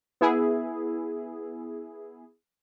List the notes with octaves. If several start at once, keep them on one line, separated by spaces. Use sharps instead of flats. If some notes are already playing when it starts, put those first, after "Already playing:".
B3 E4 G#4